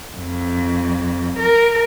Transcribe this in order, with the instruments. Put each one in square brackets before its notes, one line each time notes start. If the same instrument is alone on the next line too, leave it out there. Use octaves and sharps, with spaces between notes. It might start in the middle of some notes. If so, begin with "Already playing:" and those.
[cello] F2
A#4